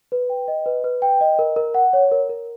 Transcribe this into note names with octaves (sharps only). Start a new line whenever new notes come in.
B4
G5
D#5
B4
B4
G5
D#5
A#4
A#4
F#5
C#5
A#4
A#4